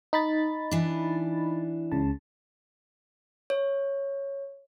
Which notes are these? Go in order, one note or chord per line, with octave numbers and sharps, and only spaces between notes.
D#4 B5 A6
E3 D4
C#2 C#3 A5
C#5